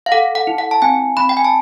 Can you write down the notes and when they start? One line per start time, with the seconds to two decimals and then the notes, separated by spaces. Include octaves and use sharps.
0.06 F5
0.12 A4 F#5
0.35 F#5
0.47 E4
0.58 F#5
0.71 A5
0.82 C4 G#5
1.17 C4 B5
1.29 G5
1.37 G#5
1.45 A5